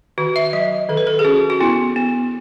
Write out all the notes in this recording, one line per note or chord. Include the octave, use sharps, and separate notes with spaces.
D#3 F#4
E5
F#3 D#5
D#3 A4
B4
A4
G#4
C#4 F#4
F#4
B3 E4
B3